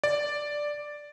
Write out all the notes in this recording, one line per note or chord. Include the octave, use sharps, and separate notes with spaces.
D5